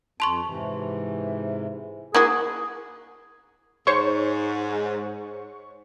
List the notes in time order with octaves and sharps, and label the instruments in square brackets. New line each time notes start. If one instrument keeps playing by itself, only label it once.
[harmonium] F2 [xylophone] A5 C6 C#6
[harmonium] G#2 C3 E3
[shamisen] A#3 E4 F#4 [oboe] G#4 [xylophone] G#6
[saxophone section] G#2 [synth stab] C5 C#5 C#6